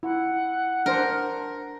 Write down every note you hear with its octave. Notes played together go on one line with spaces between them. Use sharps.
E4 F#5
D4 A#4 C5